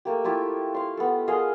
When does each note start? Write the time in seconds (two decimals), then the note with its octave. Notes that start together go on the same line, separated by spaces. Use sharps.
0.05 A3 A#3 G4
0.24 A3 E4 F4 G4
0.74 F5 C6
0.97 B3 A4
1.28 G#4 A#4 D#5 F5